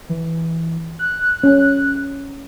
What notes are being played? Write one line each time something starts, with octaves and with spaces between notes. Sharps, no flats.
E3
F#6
C#4